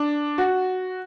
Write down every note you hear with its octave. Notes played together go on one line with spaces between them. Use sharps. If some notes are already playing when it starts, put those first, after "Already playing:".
Already playing: D4
F#4